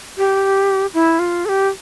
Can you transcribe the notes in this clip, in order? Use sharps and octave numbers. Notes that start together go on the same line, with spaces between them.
G4
E4
F4
A4
G4